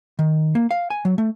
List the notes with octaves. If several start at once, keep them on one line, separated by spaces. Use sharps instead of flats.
D#3
A#3
F5
G#5
F#3
A3